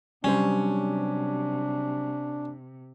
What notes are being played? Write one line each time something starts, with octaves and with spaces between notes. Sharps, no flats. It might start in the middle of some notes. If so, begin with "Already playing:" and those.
C3 F#3 G3 C#4 D4 C5